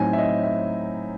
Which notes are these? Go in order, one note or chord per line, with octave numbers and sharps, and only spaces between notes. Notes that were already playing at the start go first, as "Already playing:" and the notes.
Already playing: A2 F#3 C4 D#4 G#5
E5
D#5
E5